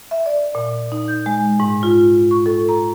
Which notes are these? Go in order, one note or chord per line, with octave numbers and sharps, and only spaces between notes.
E5
D5
A#2
D#4
G6
G#3
G#2
F4
C#6
A4
A#5